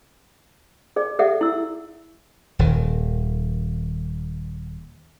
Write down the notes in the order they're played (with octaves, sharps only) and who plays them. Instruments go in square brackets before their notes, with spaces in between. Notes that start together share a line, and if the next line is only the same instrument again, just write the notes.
[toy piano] G#4 D5
G4 A4 D5 E5 F#5
E4 E6
[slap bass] D#1 D#3